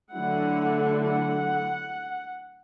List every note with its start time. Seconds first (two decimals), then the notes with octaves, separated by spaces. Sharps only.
0.13 D3 F#3 A3 E4 F#5
1.05 F#5